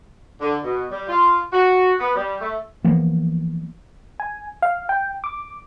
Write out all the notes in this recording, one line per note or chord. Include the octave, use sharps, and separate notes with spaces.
D3
B2
G3
F4
F#4
B3
G3
A3
E3 F3 A#3 B3
G#5
F5
G5
D6